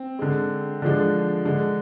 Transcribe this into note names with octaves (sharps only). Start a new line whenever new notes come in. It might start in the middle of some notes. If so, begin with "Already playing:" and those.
Already playing: C4
D3 G#3
D3 F3 G#3 D4
D3 G#3